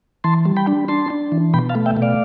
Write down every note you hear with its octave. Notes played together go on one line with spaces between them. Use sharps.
E3 A5 C6
G3
G5 B5
D4
D4 A5 C6
D4
E3
B2 G5 B5
F5 A5
A3
E5 G5
B2
D5 F5